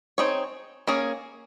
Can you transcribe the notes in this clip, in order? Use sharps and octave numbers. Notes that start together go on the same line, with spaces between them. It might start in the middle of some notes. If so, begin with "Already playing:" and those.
C4 D#4 G#4 C#5
A#3 C#4 G#4